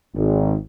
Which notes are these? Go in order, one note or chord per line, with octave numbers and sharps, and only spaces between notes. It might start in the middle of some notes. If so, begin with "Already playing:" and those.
G#1